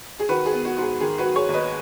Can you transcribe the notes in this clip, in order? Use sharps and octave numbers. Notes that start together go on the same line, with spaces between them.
G#4
D#3 F#4 B4
G#4
B3
F#4
G#2 F#4
G#4
D#3 G#4
F#4 B4
F#3
G#4 C#5
D#2
B4 D#5